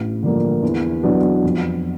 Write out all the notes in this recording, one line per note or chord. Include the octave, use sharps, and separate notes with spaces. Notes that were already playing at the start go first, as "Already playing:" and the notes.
Already playing: A1
G2 D3 F3 A#3
E2
B2 F#3 B3 D4
F2